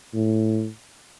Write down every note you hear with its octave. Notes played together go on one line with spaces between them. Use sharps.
A2